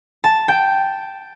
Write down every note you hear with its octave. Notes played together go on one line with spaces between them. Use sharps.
A5
G5